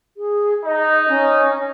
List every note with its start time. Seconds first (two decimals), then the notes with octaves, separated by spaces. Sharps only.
0.17 G#4
0.65 D#4 D#5
1.08 C#4